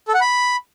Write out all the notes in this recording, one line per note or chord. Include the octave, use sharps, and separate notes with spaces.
A4
F#5
B5